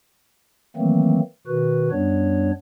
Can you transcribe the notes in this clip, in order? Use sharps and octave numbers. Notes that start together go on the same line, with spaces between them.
D#3 E3 F#3 A3 A#3 C4
B2 D#3 F#4 B4
F#2 G3 B3 D4 C#5